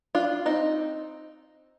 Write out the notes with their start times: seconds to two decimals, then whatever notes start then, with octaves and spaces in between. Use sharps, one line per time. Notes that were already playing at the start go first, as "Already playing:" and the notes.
0.15 D4 F4
0.46 C4 D#4